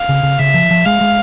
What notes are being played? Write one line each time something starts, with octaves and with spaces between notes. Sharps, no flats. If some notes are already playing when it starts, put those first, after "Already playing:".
Already playing: F5
C#3
C#3
C#3 E5
F3
F3
G#3 F5
G#3